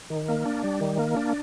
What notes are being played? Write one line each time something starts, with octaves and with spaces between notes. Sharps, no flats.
D#3
A#3
D4
G3
D#3
A#3
D4